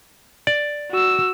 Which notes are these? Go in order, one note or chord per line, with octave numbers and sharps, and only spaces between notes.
D5
F#4 E6